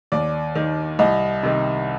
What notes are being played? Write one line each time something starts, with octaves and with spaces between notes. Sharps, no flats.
D#2 D5
D#3
C2 D#5
C3 D#3